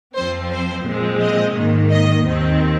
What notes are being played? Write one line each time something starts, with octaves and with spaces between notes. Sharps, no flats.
F2 F3 C4 C5
C5
A#2 F3 G#3 C4
D#5
G#2 D#3 A#3
D#5
D#2 D#3 C4